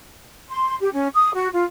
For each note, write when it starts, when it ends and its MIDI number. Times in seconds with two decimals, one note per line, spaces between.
0.49 0.76 84
0.80 0.89 67
0.92 1.07 61
1.14 1.32 87
1.34 1.47 66
1.52 1.63 65